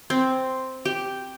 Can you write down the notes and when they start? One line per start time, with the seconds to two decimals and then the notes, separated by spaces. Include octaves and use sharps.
0.10 C4
0.85 G4